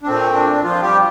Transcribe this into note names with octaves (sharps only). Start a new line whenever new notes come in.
D4
A#2 A3 C4
D4
F3 F4
G3 G4